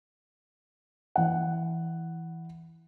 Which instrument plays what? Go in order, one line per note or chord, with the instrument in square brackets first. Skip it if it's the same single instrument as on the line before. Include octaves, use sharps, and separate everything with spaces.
[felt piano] E3 F#5